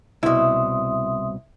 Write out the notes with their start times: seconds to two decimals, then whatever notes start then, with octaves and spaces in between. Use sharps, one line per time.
0.23 C2 B2 E4 E5 C6 D#6